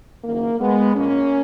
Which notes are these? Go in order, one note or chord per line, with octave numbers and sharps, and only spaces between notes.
F#1 F#2 D#3 A#3
G#3 B3
A#1 A#2 G#3 A#3 C#4